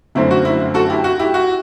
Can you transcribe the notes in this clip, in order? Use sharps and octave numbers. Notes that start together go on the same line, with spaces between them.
G1 F#2 D3 A3 C4 E4
F#4
E4
F#4 A4
E4 G4
F#4
E4 G4
F#4